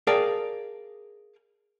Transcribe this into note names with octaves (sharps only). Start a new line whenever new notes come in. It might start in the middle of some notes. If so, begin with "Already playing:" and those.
G#4 A#4 D5 F5 G5 A5